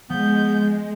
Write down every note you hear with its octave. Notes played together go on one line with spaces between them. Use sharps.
F3 G#3 B3 G6